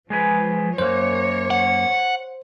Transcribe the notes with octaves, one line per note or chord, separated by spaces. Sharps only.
F3 G#3 G#4 B4
F#2 A#3 C5 C#5
F#5